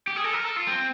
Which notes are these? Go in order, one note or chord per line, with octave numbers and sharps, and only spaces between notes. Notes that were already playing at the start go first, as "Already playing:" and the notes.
G4
G#4
A4
A#4
A4
F4
C4